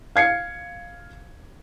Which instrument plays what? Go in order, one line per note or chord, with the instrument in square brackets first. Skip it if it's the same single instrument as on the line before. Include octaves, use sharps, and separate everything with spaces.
[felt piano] F5 G#6 C7 C#7